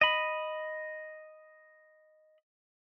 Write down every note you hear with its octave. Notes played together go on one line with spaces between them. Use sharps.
D#5 B5